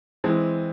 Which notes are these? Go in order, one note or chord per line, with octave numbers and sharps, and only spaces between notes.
E3 G#3 C4